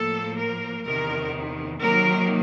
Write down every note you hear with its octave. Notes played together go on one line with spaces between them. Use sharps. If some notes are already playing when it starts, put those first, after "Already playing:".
Already playing: A2 F3 A#3 A4
A#4
E2 C3 D#3 A#4
C3 D#3 F#3 A#3 A#4